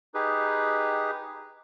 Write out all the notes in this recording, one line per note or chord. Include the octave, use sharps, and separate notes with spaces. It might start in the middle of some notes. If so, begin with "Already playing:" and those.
D#4 G4 G#4 B4